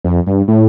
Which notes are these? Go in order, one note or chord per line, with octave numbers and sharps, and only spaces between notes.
F2
G2
A2